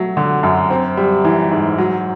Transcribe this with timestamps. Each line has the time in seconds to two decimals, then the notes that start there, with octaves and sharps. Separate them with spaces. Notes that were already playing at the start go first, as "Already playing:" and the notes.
Already playing: F#3 A3
0.17 D3
0.43 F#2
0.70 C4
0.97 G3
1.25 E3
1.51 G#2
1.78 F#3